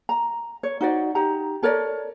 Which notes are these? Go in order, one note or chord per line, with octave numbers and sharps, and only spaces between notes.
A#5
C#5
D#4 F#4 C5 D5
D#4 G4 A#5
A4 A#4 C#5 D5